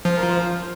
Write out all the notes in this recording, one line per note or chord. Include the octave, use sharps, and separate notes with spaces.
F3 C5
A#4
C5